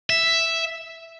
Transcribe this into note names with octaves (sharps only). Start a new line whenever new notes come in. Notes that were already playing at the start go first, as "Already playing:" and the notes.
E5